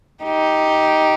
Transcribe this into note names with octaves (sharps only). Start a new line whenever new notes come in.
D#4 G4